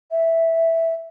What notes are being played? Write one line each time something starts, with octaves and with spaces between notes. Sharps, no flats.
E5